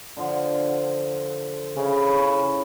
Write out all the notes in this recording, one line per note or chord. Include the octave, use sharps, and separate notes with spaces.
D3 F3
C#3 C#4 E4